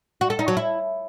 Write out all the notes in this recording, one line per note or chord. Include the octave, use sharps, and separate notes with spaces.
F#4
A4
D#4
F#3
E4